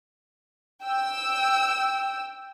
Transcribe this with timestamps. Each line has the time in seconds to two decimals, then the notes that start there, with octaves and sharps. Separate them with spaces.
0.83 G5 E6